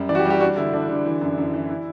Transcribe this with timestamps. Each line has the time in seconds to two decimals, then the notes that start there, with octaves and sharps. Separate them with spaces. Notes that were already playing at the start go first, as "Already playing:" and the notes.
Already playing: F#2 G3
0.09 E3 D5
0.15 F#4
0.19 G4
0.25 G3
0.30 G4
0.40 D4 F#4
0.57 D3 E4
0.73 D3 D4
0.89 D3
1.06 E3
1.21 F#2
1.38 F#2
1.54 E3
1.70 E4